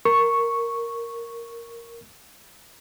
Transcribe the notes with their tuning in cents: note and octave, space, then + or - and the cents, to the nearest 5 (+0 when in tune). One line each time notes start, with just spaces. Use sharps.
A#4 +0 C#6 +0